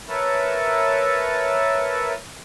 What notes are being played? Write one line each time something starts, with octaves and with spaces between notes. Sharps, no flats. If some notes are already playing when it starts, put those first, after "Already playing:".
A#4 B4 C#5 E5 A5